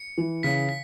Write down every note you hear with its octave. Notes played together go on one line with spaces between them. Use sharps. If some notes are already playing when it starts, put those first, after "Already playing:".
Already playing: C#7
E3
C#3 B6
B6